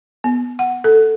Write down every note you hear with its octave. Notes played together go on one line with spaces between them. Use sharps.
B3
F#5
A4